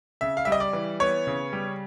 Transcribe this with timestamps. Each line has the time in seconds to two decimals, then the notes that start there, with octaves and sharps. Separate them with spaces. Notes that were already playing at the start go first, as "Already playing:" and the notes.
0.21 C#3 E5
0.37 F5
0.45 G3 E5
0.52 D#5
0.60 D5
0.73 E3
1.00 B3 C#5
1.27 C#3
1.53 G3